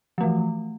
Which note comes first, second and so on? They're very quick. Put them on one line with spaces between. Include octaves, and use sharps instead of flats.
F3 A3 E3